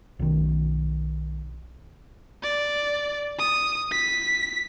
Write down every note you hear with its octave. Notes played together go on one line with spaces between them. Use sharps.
B1 D#3
D5
D#6
B6